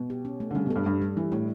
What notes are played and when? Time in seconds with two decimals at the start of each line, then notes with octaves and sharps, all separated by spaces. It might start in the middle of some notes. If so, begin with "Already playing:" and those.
Already playing: B2
0.10 G4
0.25 C#4
0.40 A3
0.51 D3
0.55 C#3 G3
0.66 B2
0.70 A4
0.76 G2
0.86 G2 D4
1.02 G3
1.17 E3 G3
1.32 A2 E4